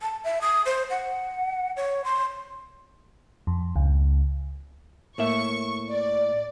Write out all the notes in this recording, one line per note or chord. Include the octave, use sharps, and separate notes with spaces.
A5
E5
D#6
C5
F#5
C#5
C6
F2
C#2
A2 A#3 E5 C#6
D5